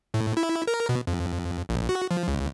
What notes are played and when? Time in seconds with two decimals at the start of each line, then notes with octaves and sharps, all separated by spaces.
0.14 A2
0.37 E4
0.67 A#4
0.89 B2
1.07 F2
1.69 A#1
1.89 F#4
2.11 F3
2.28 C#2